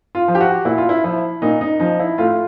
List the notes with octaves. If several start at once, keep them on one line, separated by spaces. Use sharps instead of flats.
F4
F3
G4
F#4
A#2 E4
F4
E4
F3 E4
A#2 D#4
D#4
F3 D#4
E4
A2 F4